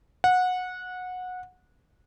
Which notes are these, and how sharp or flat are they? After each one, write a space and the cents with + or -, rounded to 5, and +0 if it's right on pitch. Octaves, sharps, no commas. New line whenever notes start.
F#5 -20